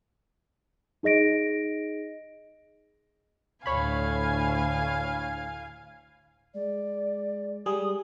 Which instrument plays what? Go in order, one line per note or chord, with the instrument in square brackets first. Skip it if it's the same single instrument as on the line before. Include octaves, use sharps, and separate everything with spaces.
[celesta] D#4 G#4 D#5 A#6 D7
[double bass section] D2 A2 [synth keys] C#5 B5 [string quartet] F5 G#5
[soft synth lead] G#3 [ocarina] D5
[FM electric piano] G3 G#4 [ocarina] D#6